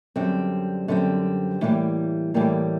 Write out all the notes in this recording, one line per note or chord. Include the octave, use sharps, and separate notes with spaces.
F#2 D3 G3 C4
F#2 D3 G3 C4
A2 E3 G3 A#3
A2 E3 G3 A#3